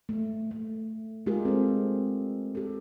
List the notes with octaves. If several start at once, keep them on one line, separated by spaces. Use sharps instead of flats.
A3
A3
G#3 F4 G4 G#4 A#4
C4 A4
G4 A4